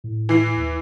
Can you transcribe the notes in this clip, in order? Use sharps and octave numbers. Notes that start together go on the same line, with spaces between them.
A2
E3 C7
D#2